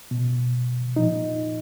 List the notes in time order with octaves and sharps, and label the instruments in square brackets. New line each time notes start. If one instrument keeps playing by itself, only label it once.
[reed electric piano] B2
A#2 F3 D#4